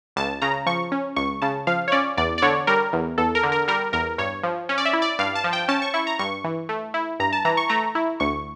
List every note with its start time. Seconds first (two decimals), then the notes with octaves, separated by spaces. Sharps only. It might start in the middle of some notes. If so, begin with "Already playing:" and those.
0.16 C#2 A5
0.42 C#3 A#5
0.66 F3 C#6
0.92 C#4
1.16 C#2 C#6
1.42 C#3 A5
1.67 F3 F5
1.88 C#5
1.92 C#4 D5
2.17 E2 D5
2.38 D5
2.42 D3 C#5
2.67 G3 A#4
2.93 E2
3.18 E2 A4
3.35 A#4
3.43 D3
3.52 A#4
3.68 G3 A#4
3.93 E2 A#4
4.18 G2 C#5
4.43 F3
4.69 C#4
4.78 D5
4.85 E5
4.93 E4
5.02 D5
5.19 G2 F5
5.35 A5
5.44 F3
5.53 G5
5.68 C#4 A5
5.82 C#6
5.94 E4 C#6
6.07 A#5
6.19 G2 C#6
6.44 E3
6.69 A3
6.94 E4
7.19 G2 A#5
7.33 A5
7.45 E3 A#5
7.57 C#6
7.69 A3 A#5
7.95 E4
8.20 D2 C#6